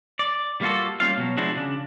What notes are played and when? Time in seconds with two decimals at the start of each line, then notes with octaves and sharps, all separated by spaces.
0.19 D5
0.61 G3 A#3 F4 F#4 A4
1.00 G3 A#3 C#4 F4 F5
1.17 B2 F#3
1.37 F3 G#3 D4 E4 F#4 G#4
1.56 C#3 D4